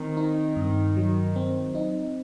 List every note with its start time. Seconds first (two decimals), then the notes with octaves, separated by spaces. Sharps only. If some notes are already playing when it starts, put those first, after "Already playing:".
Already playing: D#3 C4
0.17 D#4
0.56 G2
0.97 F#3
1.36 C4
1.75 D#4